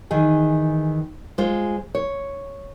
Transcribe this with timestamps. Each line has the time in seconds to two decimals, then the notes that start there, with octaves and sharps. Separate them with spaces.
0.11 D#3 E3 G#4
1.38 G#3 F4 C5
1.95 C#5